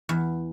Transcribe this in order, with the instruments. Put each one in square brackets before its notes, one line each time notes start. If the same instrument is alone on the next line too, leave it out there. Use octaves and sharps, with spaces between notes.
[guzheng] E2